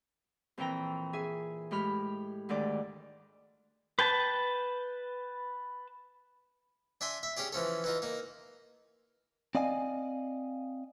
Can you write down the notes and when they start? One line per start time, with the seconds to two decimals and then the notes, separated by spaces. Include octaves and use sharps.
0.58 F2 A#2 E3 G5 A#5
1.13 G#4 E5 G#5
1.71 A2 G#3 G4 B5 F6
2.49 D2 G#2 D#3 D5
3.99 B4 G5 A5
7.01 D4 E5 G#5 C6
7.23 E5
7.37 C#4 G4 G#4 D5
7.53 E3 F3 C#4 A4
7.84 E3 D#4 F4
8.02 A#3 D#4
9.55 C4 D5 D#5 F5 G#5